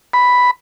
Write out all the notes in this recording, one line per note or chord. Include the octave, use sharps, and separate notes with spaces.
B5